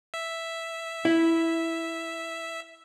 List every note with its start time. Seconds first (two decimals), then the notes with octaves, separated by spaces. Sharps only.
0.14 E5
1.05 E4